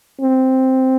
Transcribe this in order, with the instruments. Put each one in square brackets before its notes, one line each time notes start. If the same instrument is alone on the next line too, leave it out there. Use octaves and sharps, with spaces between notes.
[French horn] C4